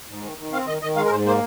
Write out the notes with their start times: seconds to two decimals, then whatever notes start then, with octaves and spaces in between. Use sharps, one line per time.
0.08 G#2
0.23 D#3
0.38 D#3
0.52 C4 F5
0.67 D#3 D#5
0.82 D#3 D#5
0.96 G#3 F5
1.05 A#4
1.11 G#2 C5
1.25 A#3 C5